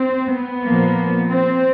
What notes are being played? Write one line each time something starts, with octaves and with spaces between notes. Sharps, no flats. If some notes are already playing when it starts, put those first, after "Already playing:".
Already playing: C4
B3
A#2 F3 A#3
C4